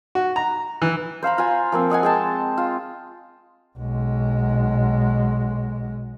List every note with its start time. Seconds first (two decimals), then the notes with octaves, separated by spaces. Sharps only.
0.15 F#4
0.36 A#5
0.82 E3
1.23 C5 F5 A#5 B5
1.38 F4 G#5
1.72 F3 A#3 C4
1.90 C4 D#5 F#5 G#5
2.03 G#3 G5 A5
2.58 F4
3.78 B1 G#3